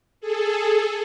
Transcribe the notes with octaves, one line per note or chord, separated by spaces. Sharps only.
G#4 A4